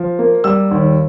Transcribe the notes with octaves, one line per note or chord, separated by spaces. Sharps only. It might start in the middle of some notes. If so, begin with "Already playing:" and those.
Already playing: F3
A#3
G3 E6
D#2